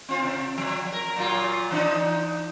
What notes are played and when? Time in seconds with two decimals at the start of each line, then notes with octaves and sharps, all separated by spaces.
0.09 C4 F4
0.23 C3
0.58 F3
0.92 A#4
1.16 A#2 F#3 F4
1.71 E3 D4 D#4